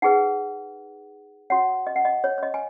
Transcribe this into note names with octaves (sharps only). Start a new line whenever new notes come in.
D#4 G#4 B4 F#5
F#4 C#5 F#5
D#5
F#5
D#5
C#5
C#5
D#5
G#5